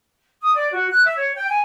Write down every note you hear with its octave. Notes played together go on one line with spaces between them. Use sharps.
D#6
D5
F#4
F#6
E5
C#5
G5
G#5